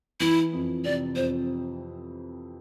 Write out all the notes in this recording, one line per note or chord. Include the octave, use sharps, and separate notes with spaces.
E3 E4
F2
C3 D5
F2 C5